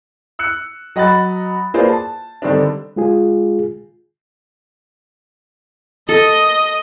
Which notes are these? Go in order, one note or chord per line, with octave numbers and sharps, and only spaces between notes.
E6 F#6 C#7
F#3 D#5 F#5 B5 F#6 A6
A#3 F4 G#4 B4 C5 D5
A5
D3 D#3 G3 C4 D4
G#3 F4 G#4
A4 D#5